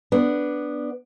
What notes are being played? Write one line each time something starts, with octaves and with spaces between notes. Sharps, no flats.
B3 D4